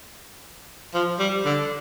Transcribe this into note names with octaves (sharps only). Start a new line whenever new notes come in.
F3
G3
D3